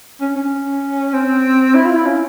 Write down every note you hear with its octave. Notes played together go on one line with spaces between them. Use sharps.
C#4
C#4
C4
E4
F4
E4
C#4